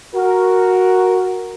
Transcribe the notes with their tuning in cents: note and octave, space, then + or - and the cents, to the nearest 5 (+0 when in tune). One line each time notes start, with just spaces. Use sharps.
F#4 +0 A#4 +0